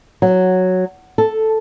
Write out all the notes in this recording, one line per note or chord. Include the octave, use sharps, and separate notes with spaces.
F#3
A4